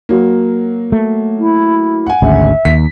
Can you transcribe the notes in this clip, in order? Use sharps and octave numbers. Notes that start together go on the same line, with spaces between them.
F#3 A#3
A3
E4
F#5 G#5
G#1 D2 C#3 E5
D#2 B6